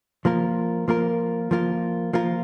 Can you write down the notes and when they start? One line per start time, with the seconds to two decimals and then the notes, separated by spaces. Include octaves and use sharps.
0.25 F3 A#3 F4 A#4
0.88 F3 A#3 F4 A#4
1.51 F3 A#3 F4 A#4
2.13 F3 A#3 F4 A#4